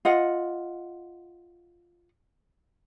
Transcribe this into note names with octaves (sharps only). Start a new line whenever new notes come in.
F4 D#5 F#5